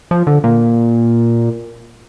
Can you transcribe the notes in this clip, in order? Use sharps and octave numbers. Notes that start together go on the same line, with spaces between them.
F3
D3
A#2